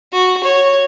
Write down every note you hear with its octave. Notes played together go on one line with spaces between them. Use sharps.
F#4
C#5